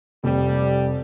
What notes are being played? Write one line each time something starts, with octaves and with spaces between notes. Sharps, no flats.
F1 G3